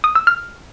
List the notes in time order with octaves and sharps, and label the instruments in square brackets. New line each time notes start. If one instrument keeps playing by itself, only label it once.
[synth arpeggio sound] D#6
E6
F6